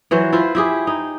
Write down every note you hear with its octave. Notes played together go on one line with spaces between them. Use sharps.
E3 F#3 C5
E4 F4 C5
E4 G4 G#4
D#4